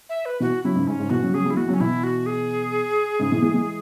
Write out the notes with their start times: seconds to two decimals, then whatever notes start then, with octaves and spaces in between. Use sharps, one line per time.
0.09 E5
0.26 B4
0.40 B2 E3 F#4
0.64 C#3 F#3 E4
0.76 G#2 C#3
0.88 G#2 C#4
0.99 G#2 C#3
1.10 B2 E3 F#4
1.22 C#3 F#3
1.34 C#3 F#3 G#4
1.45 C#3 F#3
1.50 E4
1.57 E3 G#3 F#4
1.68 C#3 F#3
1.74 C#4
1.80 B2 E3 E4
2.04 F#4
2.26 G#4
3.19 G#2 C#3
3.32 B2 E3
3.42 E3 G#3
3.54 E3 G#3